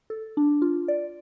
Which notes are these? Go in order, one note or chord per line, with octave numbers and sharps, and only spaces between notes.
A4
D4
F4
D5